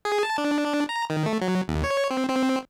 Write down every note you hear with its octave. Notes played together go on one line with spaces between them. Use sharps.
G#4
A5
D4
D4
A#5
D#3
A3
F#3
D#2
C#5
C4
C4